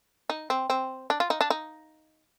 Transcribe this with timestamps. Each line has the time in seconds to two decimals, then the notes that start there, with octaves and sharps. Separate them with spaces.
0.30 D#4
0.50 C4
0.70 C4
1.10 D4
1.20 F4
1.30 D#4
1.41 D4
1.50 D#4